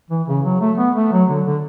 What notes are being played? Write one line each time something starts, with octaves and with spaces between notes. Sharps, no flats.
E3
C#3
F#3
A3
B3
A3
F#3
D3
D3